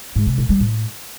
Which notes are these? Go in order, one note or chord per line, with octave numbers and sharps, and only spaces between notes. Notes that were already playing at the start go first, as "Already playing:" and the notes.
G#2
C3
A#2
G3
A2